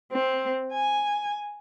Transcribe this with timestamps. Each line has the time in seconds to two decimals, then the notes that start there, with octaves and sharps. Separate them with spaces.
0.12 C4
0.73 G#5